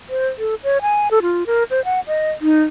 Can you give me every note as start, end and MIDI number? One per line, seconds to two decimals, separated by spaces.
0.10 0.27 72
0.39 0.55 69
0.64 0.81 73
0.82 1.08 80
1.11 1.19 69
1.23 1.44 65
1.47 1.64 70
1.70 1.83 72
1.85 2.00 78
2.07 2.31 75
2.42 2.62 63